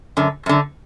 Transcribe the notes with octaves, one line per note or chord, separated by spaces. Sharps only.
F#2 D3
F#2 D3